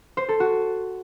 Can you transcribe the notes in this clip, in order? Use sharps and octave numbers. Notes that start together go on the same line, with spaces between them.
C5
A4
F#4